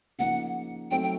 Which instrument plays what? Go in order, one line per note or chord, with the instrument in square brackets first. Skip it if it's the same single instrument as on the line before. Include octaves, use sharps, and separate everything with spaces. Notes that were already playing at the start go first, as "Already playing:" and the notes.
[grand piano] C#3 F3 A#3 D#4 [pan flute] F#5
[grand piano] F#3 A3 C4 D#4 [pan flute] G5
[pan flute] G5